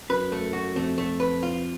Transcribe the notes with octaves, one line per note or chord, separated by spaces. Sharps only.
F#2 B4
A3
F#4
F2 A3
A3
B4
F4